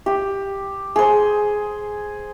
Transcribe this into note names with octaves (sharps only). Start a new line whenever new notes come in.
G4
G#4 C5